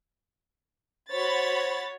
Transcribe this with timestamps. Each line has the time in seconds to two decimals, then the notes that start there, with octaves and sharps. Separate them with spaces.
1.11 F#4 C5 C#5 B5 A6